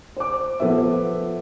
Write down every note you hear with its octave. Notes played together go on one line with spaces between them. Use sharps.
C5 D6
F3 B3 A4 B4 C5 E5